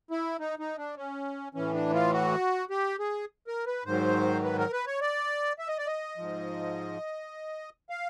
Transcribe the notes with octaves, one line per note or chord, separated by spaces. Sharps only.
E4
D#4
D#4
D4
C#4
A2 E3 C#4
D4
F4
F#4
G4
G#4
A#4
B4
G#2 D#3 F#3 C5
B4
A#4
B4
C#5
D5
E5
D#5
D5
D#5
G#2 F3
F5